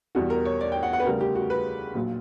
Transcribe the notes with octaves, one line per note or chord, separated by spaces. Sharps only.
E2 B2 G3 F#4
A#4
C#5
D5
G5
F#5
F#5
B4
D2 C#3 G3 A#4
G4
F#4
B4
A#1 A#2 F#3